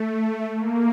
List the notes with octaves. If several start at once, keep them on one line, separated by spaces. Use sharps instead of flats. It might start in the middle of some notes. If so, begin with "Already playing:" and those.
Already playing: A3
A#3